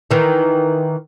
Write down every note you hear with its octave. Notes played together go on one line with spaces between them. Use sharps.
D#3 E3